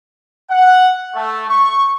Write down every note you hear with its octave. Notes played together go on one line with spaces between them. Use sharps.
F#5
A3
C#6